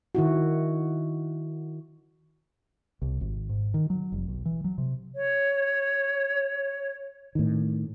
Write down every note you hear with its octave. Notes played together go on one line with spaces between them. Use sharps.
D#3 E4 F#4
C2
G#1
G#2
D#3
F#3
F1
B1
E3
F#3
C3
C#5
A2 D#3